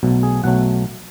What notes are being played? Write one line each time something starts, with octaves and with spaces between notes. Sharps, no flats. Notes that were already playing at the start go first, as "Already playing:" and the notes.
B1 B2 F#3 A3
G#4
B1 B2 F#3 A3 F#5